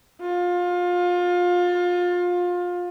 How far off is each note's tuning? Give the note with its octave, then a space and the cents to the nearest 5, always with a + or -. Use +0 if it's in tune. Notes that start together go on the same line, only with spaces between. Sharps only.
F4 +25